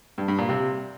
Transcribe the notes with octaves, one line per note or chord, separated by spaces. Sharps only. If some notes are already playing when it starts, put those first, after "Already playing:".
G2
G2
A#2
C3